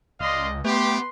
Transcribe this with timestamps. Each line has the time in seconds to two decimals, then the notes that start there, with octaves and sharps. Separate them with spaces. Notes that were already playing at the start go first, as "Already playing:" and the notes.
0.20 C#2 D5 D#5 F5 C6
0.65 A3 B3 G4 B4 C6